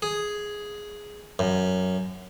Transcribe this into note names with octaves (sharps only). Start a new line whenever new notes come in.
G#4
F#2